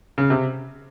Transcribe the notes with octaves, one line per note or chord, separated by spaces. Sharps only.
C#3
C3